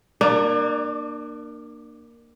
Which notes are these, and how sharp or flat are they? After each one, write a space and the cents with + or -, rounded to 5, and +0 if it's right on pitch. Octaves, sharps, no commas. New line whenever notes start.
A#3 +5 D4 +35 D5 +0